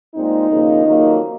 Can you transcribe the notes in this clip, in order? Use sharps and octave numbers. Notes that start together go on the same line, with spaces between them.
A#2 G#3 C4 D#4
D#2 C#3 F3 A#3
F2 D#3 F#3 A#3